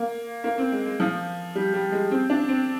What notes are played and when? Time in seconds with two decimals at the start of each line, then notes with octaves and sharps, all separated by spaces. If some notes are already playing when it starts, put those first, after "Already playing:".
Already playing: A#3
0.44 A#3
0.58 C4
0.72 G#3
0.86 G#3
1.00 F3
1.55 G3
1.74 G3
1.92 G#3
2.11 C4
2.30 D4
2.48 C4